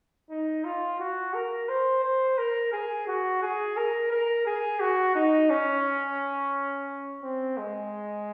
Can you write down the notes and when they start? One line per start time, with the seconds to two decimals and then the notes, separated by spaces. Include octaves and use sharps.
0.30 D#4
0.64 F4
1.00 F#4
1.34 A#4
1.69 C5
2.03 C5
2.38 A#4
2.73 G#4
3.07 F#4
3.42 G#4
3.77 A#4
4.11 A#4
4.46 G#4
4.80 F#4
5.15 D#4
5.50 C#4
7.23 C4
7.58 G#3